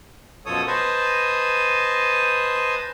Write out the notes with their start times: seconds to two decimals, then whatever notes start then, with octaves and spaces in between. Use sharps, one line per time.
0.46 F#2 B2 F3 A4 C#5 D#6
0.67 B4 C5 D#5 G#5 A5